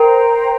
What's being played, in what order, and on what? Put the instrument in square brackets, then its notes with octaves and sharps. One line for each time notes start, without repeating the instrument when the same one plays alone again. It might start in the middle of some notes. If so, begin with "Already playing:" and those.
Already playing: [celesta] A#4 [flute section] C5 G5 A#5